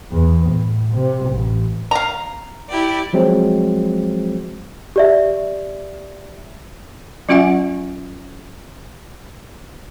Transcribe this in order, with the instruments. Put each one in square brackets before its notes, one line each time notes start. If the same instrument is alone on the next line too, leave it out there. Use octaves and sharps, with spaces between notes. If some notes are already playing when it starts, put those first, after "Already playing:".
[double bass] E2
A2
C3
A1
[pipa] F5 A#5
[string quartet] E4 G4 D5
[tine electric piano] F3 F#3 G#3 C4
[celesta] G4 D5 E5
[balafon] F#3 C#4 F4 E5 F#5 G#5